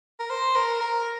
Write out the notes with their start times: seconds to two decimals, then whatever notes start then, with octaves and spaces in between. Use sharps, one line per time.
0.20 A#4
0.30 C5
0.56 A#4
0.81 A#4